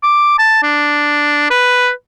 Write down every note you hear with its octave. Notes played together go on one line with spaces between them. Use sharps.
D6
A5
D4
B4